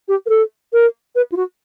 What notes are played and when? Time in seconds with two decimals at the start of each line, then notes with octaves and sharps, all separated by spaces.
0.08 G4
0.26 A#4
0.29 A4
0.73 A#4
1.15 B4
1.32 F4
1.36 F#4